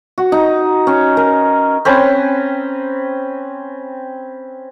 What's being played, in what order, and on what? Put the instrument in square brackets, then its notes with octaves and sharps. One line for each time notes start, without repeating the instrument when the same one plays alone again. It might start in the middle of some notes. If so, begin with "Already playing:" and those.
[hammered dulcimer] F#4
D#4
C#4
A#4
[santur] C4 C#4 B4 A#5